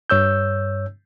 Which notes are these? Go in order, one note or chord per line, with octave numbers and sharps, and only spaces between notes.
G2 C#5 E6 G6